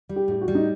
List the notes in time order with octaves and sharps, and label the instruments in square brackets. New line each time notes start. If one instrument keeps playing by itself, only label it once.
[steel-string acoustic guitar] G3
[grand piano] G4
[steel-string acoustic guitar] A2 [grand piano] G4
[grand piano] F#4
[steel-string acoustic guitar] G3
[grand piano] D#4